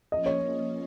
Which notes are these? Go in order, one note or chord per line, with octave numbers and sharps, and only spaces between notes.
F3 A#3 C#4 F4 D#5
C#5